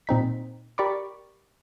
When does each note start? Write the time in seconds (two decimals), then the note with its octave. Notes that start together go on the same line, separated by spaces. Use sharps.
0.07 A#2 C4 D#4 B6
0.78 G4 A#4 D5 B5 C#6 D6